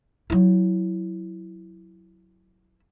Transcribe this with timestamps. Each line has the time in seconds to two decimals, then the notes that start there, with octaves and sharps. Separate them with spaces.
0.30 F#3 E4